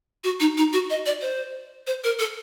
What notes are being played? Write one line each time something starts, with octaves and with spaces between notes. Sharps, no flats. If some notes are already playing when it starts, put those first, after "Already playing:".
F#4
D#4
D#4
F#4
D#5
D5
C5
C5
A#4
A4